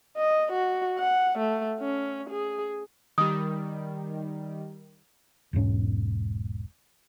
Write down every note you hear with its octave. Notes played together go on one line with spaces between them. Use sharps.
D#5
F#4
F#5
A3
C#4
G#4
D#3 G3 D#6
E1 B1 G#2 C#4